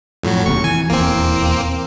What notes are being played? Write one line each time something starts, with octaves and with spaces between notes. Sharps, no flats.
F2 A2 F#3
E1 D#2 C3 C#6
E3 G#5
D#1 E2 E3 A#3 C4